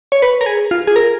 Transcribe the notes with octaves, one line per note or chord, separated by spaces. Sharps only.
C#5
B4
A#4
G#4
F4
G#4
A#4